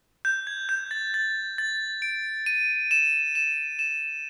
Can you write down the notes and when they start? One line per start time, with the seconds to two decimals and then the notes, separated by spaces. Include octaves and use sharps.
0.25 G6
0.47 G#6
0.69 G6
0.91 A6
1.14 A6
1.58 A6
2.02 D7
2.46 D#7
2.91 E7
3.35 E7
3.79 E7